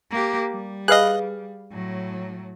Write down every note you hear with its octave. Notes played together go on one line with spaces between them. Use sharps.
A#3 G4
G3
G#4 B4 D#5 F5 F#6
A2 F#3